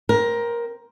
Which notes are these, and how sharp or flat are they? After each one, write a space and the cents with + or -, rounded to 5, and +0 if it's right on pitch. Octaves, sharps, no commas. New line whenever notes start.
C4 +0 A#4 +15